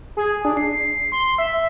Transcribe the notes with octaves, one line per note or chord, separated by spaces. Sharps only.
G#4
D4
C7
C6
E5